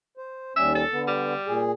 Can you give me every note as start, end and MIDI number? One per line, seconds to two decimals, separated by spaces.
0.17 0.53 72
0.56 0.83 39
0.56 0.83 55
0.56 0.83 61
0.56 0.72 76
0.75 1.01 69
0.92 1.34 50
0.92 1.34 59
1.07 1.64 55
1.47 1.72 46
1.47 1.72 68